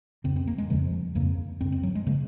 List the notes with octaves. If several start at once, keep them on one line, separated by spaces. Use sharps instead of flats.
F2 C#3 C4
C4
A#3
G#3
F2 C#3 F3
F2 C#3 A#3
F#2 C#3 C4
C4
F#3
G#3
C#3 A#3